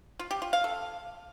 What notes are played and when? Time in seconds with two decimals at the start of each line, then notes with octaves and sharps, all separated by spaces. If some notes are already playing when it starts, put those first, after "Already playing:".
0.19 F4
0.31 G4
0.42 F4
0.53 F5
0.64 A4